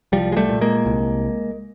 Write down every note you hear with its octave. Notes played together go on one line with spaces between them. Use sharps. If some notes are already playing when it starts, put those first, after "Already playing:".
C2 F3 G3
G#3
G3 A3
A#2
G#3 A#3
C2